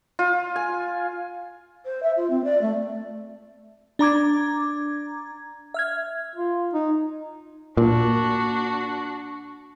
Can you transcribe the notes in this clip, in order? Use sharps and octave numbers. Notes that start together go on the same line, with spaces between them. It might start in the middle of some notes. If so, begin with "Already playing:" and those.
F4
G#5
C5
E5
F4
C4
D5
A3
D4 A#5 D6 G#6
E5 F6 G#6
F4
D#4
A#2 D4 F#4